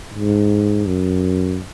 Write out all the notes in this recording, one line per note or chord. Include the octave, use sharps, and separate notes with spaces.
G#2
F#2